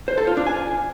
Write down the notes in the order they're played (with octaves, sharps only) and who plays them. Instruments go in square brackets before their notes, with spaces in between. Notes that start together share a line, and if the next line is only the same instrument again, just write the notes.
[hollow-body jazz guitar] C5
A4
F4
D4
G#5